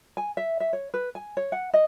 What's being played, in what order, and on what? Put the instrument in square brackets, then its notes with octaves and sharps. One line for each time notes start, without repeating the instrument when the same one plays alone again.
[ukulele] G#5
E5
E5
C#5
B4
G#5
C#5
F#5
D#5